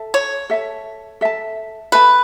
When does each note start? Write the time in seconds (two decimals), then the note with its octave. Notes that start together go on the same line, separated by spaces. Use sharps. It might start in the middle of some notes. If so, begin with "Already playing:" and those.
Already playing: A4 E5 A5
0.14 C#5
0.50 A4 E5 A5
1.21 A4 E5 A5
1.92 A4 B4 E5 A5